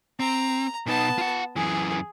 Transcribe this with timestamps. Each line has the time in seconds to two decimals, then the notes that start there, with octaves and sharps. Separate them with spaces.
0.20 C4 A#5
0.86 B2 B3 D#4 A5
1.18 F4 F#5
1.56 F#2 E3 G#4